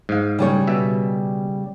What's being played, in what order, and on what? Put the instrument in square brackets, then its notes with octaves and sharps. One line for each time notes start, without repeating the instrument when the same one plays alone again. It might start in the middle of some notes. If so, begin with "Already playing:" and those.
[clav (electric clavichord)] G#2 F5
[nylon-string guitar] C#3 G3 C#5
[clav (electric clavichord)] B2 E5